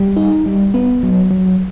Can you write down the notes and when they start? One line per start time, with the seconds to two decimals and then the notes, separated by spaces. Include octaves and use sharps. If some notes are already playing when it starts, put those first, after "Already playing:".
Already playing: G3
0.17 D#4
0.46 G3
0.74 B3
1.03 F#3
1.31 F#3